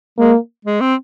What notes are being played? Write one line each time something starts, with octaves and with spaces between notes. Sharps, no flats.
G#3 A#3
G#3
C4